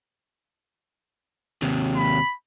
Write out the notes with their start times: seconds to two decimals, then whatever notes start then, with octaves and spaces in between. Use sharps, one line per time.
1.62 D#2 C3
1.96 B5